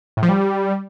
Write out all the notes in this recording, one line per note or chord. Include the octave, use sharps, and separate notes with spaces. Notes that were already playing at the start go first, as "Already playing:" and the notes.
A2
F3
G3